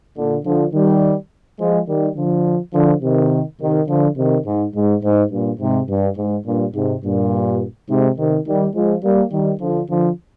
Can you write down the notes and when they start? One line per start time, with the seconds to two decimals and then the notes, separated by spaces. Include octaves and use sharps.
0.17 A#2 D3
0.45 D3 F3
0.73 D#3 G3
1.59 F3 G#3
1.88 D#3 G3
2.16 D3 F3
2.73 D3 F3
3.02 C3 D#3
3.60 C3 D#3
3.88 D3 F3
4.17 C3 D#3
4.46 G#2
4.75 G#2
5.03 G#2
5.31 G2 A#2
5.60 G#2 C3
5.89 G2
6.17 G#2
6.45 G2 A#2
6.75 G#2 C3
7.03 G2 A#2
7.89 G#2 C3
8.17 C3 D#3
8.47 D#3 G3
8.74 F3 G#3
9.03 G3 A#3
9.32 D#3 G3
9.60 D3 F3
9.89 D3 F3